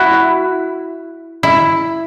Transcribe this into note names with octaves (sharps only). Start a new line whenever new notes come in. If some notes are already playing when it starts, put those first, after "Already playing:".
Already playing: E4 F#4
E4